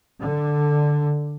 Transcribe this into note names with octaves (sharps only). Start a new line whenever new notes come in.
D3